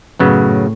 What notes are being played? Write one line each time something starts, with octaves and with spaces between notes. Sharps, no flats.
F#2 A2 C#3 F#3 B3